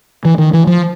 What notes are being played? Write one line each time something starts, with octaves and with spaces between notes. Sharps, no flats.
E3
D#3
E3
F3